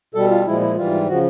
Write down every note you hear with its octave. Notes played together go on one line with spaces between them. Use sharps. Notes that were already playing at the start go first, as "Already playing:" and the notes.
B2 G3 A4
F4
A#2 F3 G#3 E4
E4
G#2 E3 G3 F4
C#3 F3 F#4